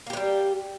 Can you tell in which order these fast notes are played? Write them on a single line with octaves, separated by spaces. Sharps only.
A#3 G4 G#3 G3